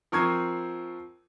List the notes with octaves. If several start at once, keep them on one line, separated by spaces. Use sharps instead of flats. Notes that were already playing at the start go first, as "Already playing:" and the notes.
F3 C4 A#4 C#6 D#6 G#6